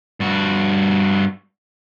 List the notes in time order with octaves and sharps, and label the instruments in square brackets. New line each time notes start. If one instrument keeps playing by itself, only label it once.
[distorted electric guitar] G2 F#4